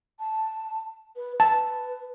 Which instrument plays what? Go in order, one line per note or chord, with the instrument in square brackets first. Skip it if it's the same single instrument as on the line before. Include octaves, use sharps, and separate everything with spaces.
[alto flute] A5
B4
[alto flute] B4 [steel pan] A5